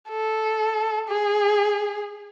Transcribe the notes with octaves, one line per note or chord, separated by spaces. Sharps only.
A4
G#4